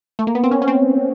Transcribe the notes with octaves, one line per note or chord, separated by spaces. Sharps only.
A3
A#3
B3
C4
C#4
C#4
C4